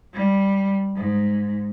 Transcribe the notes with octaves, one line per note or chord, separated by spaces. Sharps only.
G3
G#2